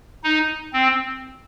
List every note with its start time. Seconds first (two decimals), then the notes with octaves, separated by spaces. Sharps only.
0.24 D#4
0.73 C4